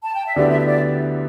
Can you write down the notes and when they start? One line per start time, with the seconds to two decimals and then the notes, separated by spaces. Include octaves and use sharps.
0.04 A5
0.14 G5
0.26 E5
0.36 D2 D3 B3 E4 G4 D5
0.50 E5
0.60 E5
0.65 D5